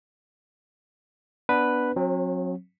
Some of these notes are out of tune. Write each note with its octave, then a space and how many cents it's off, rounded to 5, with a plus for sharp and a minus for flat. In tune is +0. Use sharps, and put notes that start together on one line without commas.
B3 +0 D4 +0 B4 +0
F#3 -30 C4 +35